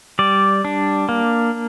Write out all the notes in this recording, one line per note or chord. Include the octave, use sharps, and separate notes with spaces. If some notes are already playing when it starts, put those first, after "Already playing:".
G3 D5
D4
A#3